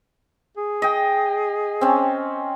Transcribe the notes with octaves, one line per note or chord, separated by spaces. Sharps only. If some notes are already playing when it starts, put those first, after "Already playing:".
G#4
D#5 G5
C4 C#4